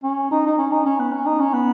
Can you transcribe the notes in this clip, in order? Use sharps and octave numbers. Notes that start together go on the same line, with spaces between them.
C#4
D#4
D#4
C#4
D#4
C#4
B3
C#4
D#4
C#4
B3